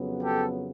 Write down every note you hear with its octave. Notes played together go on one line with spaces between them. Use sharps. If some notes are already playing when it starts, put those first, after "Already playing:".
Already playing: F2 C#3 F#3 B3
G4 A4